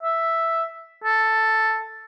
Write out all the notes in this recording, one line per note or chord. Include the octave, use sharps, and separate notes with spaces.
E5
A4